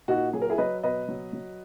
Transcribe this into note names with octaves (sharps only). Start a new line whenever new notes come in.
A#2 D#4 F#4
F#3 G#4
A#4
E4 G#4
F#3 B4 D#5
B2 B4 D#5
F#3
F#3